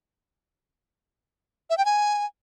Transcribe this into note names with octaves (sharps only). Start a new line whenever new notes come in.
E5
G5
G#5